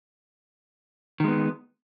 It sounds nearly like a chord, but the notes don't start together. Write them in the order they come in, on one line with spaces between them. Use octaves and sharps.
D#3 G#3 B3